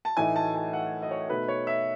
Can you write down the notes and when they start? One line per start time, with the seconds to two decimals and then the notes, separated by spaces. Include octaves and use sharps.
0.05 A5
0.17 A2 E3 A3 D#4 G#5
0.36 A5
0.55 G#5
0.73 F#5
1.02 D#5
1.11 C#5
1.29 B2 A3 D#4 B4
1.48 C#5
1.67 E5